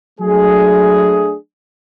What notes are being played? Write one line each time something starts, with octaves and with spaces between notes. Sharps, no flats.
F#3 A3 D4 G#4